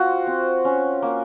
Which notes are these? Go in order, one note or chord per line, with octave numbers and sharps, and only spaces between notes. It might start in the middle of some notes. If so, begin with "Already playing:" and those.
Already playing: C4 F4 F#4
C4
C#4
A#3